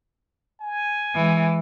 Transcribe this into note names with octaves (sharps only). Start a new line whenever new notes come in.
G#5
E3 G#3